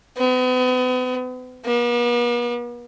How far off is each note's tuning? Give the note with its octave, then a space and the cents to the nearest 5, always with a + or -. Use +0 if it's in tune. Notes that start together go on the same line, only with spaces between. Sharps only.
B3 +40
B3 -45